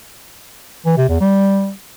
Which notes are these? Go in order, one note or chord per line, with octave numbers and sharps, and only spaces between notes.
E3
C3
E2
G3